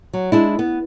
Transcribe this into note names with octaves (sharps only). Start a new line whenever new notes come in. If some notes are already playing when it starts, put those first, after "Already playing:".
F#3
G#3 D4 E4
B3